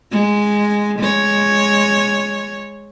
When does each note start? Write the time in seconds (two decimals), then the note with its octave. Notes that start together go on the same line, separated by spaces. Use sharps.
0.11 G#3
0.99 G#3 C#5